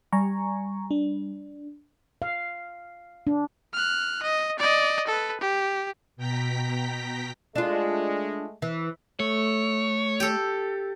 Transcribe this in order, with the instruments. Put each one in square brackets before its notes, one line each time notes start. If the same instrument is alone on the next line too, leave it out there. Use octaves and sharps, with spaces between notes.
[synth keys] G3 [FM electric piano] G#5 A#5 C#6
[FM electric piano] D4
[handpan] F5
D4
[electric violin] F6 F#6
D#5
D5 D#5
A4 B4
G4
[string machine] B2 G5 A#5 B6
[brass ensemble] G#3 A3 [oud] D4 F4
[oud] E3
[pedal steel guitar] A3 [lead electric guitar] C#5
[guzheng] G4 A4